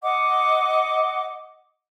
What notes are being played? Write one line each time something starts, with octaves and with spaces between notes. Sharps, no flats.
D#5 F#5 D6